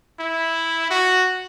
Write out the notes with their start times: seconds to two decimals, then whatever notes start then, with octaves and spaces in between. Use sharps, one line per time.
0.20 E4
0.91 F#4